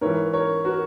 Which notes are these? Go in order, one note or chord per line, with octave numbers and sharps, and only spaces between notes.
G#2 E3 A#4 C#5
A#4 C#5
F#4 A#4